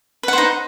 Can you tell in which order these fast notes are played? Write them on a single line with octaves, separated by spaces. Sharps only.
B4 F#5 C5 D#4